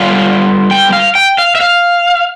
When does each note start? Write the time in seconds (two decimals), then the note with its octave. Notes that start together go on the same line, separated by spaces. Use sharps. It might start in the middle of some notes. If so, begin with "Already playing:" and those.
Already playing: D3 G3 B3 F4 F5
0.71 G5
0.93 F5
1.15 G5
1.38 F5
1.55 E5
1.61 F5